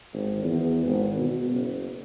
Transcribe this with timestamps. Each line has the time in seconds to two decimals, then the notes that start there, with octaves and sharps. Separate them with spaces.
0.13 G#1
0.44 E2
0.86 G#1
1.17 B2
1.51 F#1